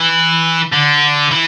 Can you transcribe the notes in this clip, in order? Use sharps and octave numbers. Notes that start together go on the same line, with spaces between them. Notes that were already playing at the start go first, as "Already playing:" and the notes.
Already playing: E3
D3
E3